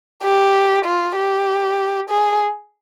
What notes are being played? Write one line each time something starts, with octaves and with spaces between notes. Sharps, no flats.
G4
F4
G4
G#4